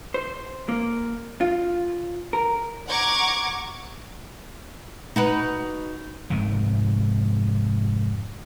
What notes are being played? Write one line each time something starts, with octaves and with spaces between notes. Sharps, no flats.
C5
A#3
F4
A#4
F#5 A#5 C#6 D6 G#6
D#4 F#4 B4
F1 G#2 C3 D#3